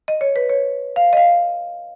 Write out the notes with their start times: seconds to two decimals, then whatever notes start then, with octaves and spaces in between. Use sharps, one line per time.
0.08 D#5
0.21 C#5
0.36 B4
0.49 C#5
0.96 F5
1.13 D#5
1.17 F5